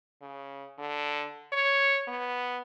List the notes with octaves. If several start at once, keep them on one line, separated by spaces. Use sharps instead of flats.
C#3
D3
C#5
B3